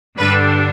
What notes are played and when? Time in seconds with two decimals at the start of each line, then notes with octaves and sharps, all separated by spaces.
0.18 G2 D3 G3 D4 B4